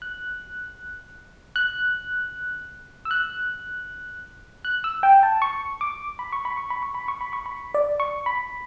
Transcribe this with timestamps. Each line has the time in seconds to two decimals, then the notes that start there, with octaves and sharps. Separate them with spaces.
0.02 F#6
1.56 F#6
3.05 E6
3.11 F#6
4.65 F#6
4.84 E6
5.03 G5
5.23 A5
5.42 C#6
5.81 D6
6.19 B5
6.32 C#6
6.45 B5
6.57 C#6
6.70 B5
6.83 C#6
6.94 B5
7.08 C#6
7.21 B5
7.33 C#6
7.46 B5
7.74 D5
8.00 C#6
8.26 B5